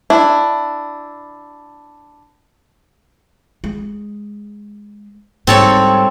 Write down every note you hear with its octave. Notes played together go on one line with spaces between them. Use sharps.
D4 E4
G#3
G#2 G3 C4 A4 C#5